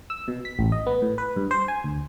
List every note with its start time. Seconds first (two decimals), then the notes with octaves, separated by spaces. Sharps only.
0.10 E6
0.28 B2
0.45 B6
0.59 A1
0.72 D#5
0.86 B3
1.02 A2
1.18 B4
1.36 G2
1.51 C5
1.68 G#5
1.84 D2